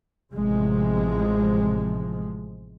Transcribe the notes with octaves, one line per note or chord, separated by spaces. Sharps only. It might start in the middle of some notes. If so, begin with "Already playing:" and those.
A1 C3 F3 G#3